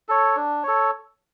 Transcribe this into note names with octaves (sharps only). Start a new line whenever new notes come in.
A4 C#5
D4
A4 C#5